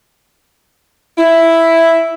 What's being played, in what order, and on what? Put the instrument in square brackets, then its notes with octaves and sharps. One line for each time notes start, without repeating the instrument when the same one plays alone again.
[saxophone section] E4